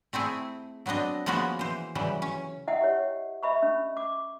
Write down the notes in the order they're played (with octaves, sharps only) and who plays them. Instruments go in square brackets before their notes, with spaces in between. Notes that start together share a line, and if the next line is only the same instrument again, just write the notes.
[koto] A3 C4 E4 G#4
F#3 B3 C4 D4 D#5
F3 G#3 A#3 B3 C#4 F#4
E3 C5
C#3 E3 F#3 G3
C#4
[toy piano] E4 D#5 E5 F#5 G5
G4 C#5
D#5 E5 B5 C#6
C#4
D6